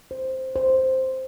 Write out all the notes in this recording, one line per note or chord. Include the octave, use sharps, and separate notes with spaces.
C5
C5